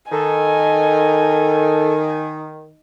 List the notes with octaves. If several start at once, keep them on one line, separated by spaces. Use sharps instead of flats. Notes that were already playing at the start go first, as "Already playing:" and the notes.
D#3 D#4 A4 G#5